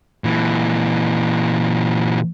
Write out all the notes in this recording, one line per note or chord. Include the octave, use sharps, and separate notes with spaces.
A#2 E3